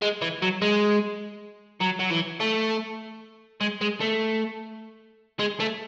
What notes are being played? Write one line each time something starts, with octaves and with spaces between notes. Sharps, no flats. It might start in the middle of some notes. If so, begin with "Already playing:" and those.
G#3
E3
F#3
G#3
F#3
F#3
E3
A3
G#3
G#3
A3
G#3
A3